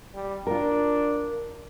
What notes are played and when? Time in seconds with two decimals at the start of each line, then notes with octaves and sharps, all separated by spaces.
0.14 G3
0.47 D4 F4 A#4